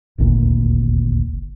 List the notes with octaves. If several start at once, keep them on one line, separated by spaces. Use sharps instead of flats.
D#1 G#1 D2 A#2